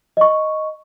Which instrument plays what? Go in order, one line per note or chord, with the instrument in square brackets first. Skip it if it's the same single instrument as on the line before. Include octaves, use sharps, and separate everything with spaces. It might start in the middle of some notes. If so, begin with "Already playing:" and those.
[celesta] D#5 C#6